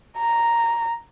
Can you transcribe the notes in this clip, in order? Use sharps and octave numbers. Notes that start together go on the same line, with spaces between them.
A#5